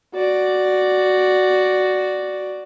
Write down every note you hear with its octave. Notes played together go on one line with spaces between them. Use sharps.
F#4 D5